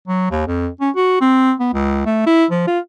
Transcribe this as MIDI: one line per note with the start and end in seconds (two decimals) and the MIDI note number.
0.08 0.29 54
0.31 0.44 39
0.47 0.69 41
0.81 0.90 61
0.96 1.20 66
1.21 1.53 60
1.60 1.69 59
1.74 2.06 37
2.06 2.25 57
2.27 2.45 64
2.51 2.64 53
2.67 2.79 65